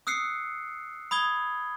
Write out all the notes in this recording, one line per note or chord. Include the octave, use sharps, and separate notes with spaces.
D#6 E6 F#6 C7 C#7
B5 D#6 G#6 G7